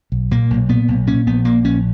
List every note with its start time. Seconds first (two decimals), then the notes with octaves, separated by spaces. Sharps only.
0.12 B1
0.31 A#2 A#3
0.50 B1
0.69 A#2 B3
0.88 B1
1.07 A#2 C#4
1.27 A#1 B3
1.45 A#2 A#3
1.64 A#1 C#4